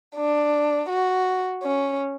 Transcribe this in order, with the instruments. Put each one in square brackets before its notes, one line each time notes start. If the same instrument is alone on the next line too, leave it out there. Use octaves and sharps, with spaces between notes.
[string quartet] D4
F#4
C#4